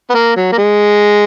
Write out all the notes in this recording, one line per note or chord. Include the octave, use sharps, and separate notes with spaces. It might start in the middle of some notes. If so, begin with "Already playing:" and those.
B3
A#3
F#3
A#3
G#3